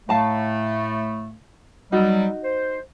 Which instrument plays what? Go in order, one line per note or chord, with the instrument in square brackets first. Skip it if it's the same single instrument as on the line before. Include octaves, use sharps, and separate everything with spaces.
[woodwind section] A2 A3 [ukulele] F5 A5 A#5
[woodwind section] F#3 G3 [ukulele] D#4 F#4
[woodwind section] C5